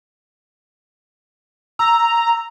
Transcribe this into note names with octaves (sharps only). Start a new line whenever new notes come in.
A#5 E6